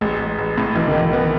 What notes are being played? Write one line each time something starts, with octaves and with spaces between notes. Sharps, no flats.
A1 G#3
A1
A1
A2
B1 E3
D#3
B1
E3
B3